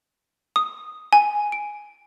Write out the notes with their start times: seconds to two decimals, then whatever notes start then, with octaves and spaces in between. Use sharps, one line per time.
0.56 D#6
1.13 G#5
1.52 D7